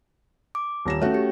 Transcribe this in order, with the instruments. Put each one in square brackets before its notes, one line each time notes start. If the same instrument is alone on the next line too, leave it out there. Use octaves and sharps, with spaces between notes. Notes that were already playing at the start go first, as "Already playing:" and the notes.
[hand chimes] D6
[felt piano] D#1 A#6 E7
[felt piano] A3 F#4 [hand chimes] C#4 C#5
[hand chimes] G4